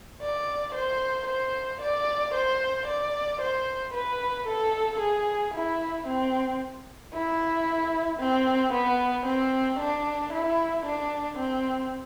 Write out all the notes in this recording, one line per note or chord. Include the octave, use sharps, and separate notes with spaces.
D5
C5
C5
D5
C5
D5
C5
B4
A4
G#4
E4
C4
E4
C4
B3
C4
D4
E4
D4
C4